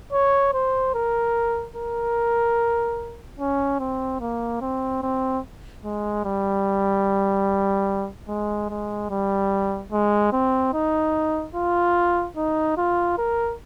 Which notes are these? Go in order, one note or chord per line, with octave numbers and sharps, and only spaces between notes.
C#5
C5
A#4
A#4
C#4
C4
A#3
C4
C4
G#3
G3
G#3
G#3
G3
G#3
C4
D#4
F4
D#4
F4
A#4